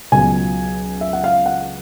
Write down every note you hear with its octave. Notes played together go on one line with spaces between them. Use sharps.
C#2 B2 F#3 G#5
E5
F#5
F5
F#5